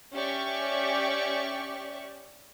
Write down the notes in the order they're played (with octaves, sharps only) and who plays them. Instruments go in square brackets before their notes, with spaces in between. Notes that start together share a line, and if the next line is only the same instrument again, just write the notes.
[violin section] C#4 G4 D5 E5 C#6